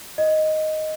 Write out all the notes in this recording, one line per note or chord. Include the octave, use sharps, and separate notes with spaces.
D#5